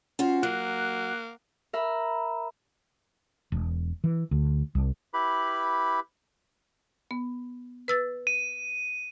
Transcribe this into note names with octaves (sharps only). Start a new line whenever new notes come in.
C#4 F4 F#4 C5
F#3 A#3 F#6
A#4 E5 B5
E1
E3
D2
C2
E4 G4 B4 B5
B3
B4 E6 A6
D#7